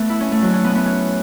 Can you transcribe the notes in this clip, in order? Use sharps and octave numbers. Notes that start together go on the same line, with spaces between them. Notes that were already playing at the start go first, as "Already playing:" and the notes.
Already playing: A3 B3
E4
C#4
A3
F#3
C#4
B3
B3
C#4